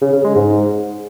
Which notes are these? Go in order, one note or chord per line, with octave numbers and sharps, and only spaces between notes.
C#3
C#3
G#3
G#2